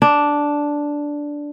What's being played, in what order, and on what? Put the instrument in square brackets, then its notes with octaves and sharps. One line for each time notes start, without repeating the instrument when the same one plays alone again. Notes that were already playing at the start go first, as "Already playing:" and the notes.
[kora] D4